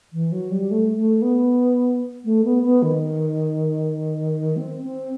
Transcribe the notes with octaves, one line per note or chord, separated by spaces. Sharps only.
E3
F#3
G3
A3
A3
B3
A3
B3
B3
D#3
C4
C4